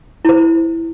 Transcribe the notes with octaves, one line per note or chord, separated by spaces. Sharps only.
E4 C5